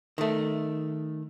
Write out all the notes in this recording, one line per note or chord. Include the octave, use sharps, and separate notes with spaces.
D#3 A3